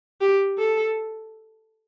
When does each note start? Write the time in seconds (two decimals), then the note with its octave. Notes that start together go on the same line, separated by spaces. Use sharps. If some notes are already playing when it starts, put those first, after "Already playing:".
0.21 G4
0.59 A4